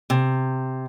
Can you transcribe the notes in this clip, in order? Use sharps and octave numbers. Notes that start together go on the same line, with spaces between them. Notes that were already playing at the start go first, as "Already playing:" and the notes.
C3